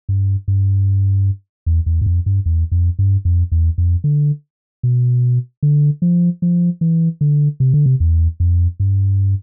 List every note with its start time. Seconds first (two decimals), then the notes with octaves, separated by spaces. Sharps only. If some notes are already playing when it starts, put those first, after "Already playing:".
0.09 G2
0.48 G2
1.66 E2
1.86 E2
2.01 G2
2.06 F2
2.26 G2
2.46 E2
2.72 F2
2.99 G2
3.25 F2
3.52 E2
3.78 F2
4.04 D3
4.83 B2
5.63 D3
6.02 F3
6.42 F3
6.81 E3
7.21 D3
7.60 C3
7.74 D3
7.86 C3
8.00 E2
8.40 F2
8.80 G2